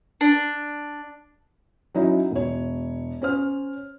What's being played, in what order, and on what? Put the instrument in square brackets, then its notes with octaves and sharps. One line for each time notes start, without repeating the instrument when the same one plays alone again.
[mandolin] D4
[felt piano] F#3 C#4 D#4 E4 C#5 D#5
E1 C#5
C#4 C5 F6